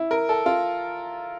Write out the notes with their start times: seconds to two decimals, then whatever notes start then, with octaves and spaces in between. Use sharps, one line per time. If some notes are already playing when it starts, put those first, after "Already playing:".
Already playing: E4
0.11 A#4
0.29 A4
0.46 F4